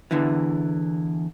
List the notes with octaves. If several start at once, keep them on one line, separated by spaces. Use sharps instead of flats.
E2 D3 E3